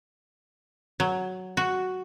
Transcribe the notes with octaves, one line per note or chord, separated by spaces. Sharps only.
F#3
F#4